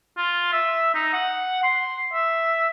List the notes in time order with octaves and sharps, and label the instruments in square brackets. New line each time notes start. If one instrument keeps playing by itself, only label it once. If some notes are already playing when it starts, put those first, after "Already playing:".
[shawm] F4
E5
D#4
F#5
C6
E5